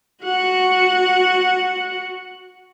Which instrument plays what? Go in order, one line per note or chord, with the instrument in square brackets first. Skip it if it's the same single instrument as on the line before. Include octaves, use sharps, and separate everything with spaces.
[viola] F#4 F#5